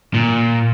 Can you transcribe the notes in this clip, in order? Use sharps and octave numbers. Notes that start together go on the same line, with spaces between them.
A#2